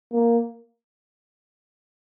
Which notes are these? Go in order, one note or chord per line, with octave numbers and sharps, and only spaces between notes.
A#3